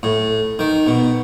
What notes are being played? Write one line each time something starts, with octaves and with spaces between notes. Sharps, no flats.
A2
D#3
B2